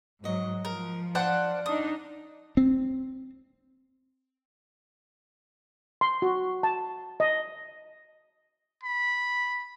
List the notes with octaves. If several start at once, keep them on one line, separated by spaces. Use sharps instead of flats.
G#2 F#3 F#4 D#5
F3 A#4
D4 C5 D5 F5 F#5
D4 D#4 D#6
C4
C6
F#4
A5
D#5
B5